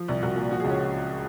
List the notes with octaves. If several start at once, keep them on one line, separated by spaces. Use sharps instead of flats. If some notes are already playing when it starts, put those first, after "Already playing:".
Already playing: F3
C2
C2 F#4
A#2
F3 F#4
C#2 G#4
C#4